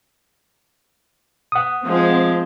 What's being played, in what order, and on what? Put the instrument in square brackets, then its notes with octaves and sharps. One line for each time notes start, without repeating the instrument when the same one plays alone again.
[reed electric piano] F#5 D#6
[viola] F3 G#3 [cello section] C4